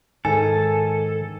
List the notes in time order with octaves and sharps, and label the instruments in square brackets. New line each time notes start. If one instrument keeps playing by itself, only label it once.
[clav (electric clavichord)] G#2 D#3 [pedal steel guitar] A4 [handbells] G#5